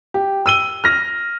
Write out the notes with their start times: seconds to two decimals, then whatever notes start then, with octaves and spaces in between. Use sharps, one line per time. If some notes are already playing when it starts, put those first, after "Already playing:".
0.14 G4
0.46 E6 D#7 G7
0.84 F6 A#6